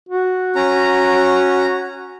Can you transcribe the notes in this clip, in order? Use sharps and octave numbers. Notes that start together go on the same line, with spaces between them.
F#4
C#4 A#5